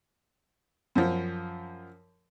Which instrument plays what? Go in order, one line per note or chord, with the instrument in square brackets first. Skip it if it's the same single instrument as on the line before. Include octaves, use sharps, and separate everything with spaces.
[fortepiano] F#2 F3